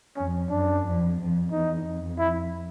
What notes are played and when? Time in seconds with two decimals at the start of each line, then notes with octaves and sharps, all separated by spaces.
0.16 F2 C#4
0.50 F#2 D4
0.84 F2
1.18 F2
1.51 E2 D#4
1.85 F2
2.18 E4